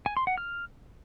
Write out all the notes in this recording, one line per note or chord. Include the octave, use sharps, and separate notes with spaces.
G#5
C6
F#5
F6